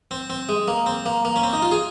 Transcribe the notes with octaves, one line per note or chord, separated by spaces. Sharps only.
C4
C4
G#3
A#3
C4
A#3
A#3
C#4
C4
D#4
F4
G#4